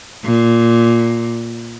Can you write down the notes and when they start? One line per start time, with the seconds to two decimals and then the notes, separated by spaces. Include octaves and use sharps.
0.24 A#2